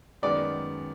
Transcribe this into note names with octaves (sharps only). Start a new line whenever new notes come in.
F#2 D#3 G#3 B3 D5